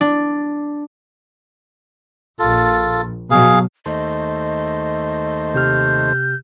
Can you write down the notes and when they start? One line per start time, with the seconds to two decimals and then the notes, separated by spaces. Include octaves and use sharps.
0.01 D4
2.39 A#1 F4 A4
3.31 B2 F#3 G#4 F5
3.86 D#2 A3 C5 D#5
5.55 C3 G4 F6 G6